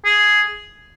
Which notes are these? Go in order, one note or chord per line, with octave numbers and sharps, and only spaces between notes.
G#4